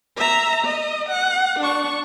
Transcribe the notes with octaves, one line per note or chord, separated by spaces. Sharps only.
E5 A#5
D#5
F#5
D4 C#6